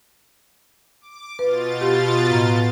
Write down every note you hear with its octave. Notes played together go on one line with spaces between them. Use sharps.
D6
B2 F4 B4 A6
G4
A2 A#5